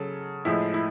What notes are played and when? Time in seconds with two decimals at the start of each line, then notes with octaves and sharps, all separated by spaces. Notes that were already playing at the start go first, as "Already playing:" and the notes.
Already playing: C#3 F#3 A4
0.45 A2 F3 G#3 E4
0.74 E4